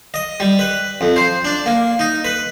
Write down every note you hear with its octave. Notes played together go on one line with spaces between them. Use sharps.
D#5
G3
B4
F2
C5
D4
A#3
D#4
B4